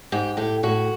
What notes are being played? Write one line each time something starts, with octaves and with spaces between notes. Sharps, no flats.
G#2 G4
A2 G4
A2 F#4